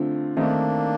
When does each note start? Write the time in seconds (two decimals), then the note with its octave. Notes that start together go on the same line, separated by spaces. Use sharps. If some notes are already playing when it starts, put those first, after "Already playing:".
Already playing: D3 A3 C4 F4
0.36 D#3 A3 A#3 C4 D4 D#4